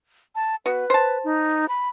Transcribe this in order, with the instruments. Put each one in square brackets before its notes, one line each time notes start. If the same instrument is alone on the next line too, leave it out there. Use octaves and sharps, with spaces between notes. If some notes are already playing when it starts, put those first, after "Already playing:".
[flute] A5
[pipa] B3 F#4 [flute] B4
[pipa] C5 A5
[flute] D#4
B5